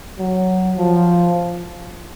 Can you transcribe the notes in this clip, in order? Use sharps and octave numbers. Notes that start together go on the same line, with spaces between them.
F#3
F3